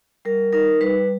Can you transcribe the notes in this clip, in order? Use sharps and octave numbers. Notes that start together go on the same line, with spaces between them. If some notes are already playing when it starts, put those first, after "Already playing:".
G3 A#4
D#4 A#4
G3 B4